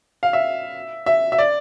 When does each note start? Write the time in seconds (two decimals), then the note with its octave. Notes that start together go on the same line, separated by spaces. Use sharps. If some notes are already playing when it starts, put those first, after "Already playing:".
0.23 F5
0.33 E5
1.06 E5
1.32 E5
1.38 D5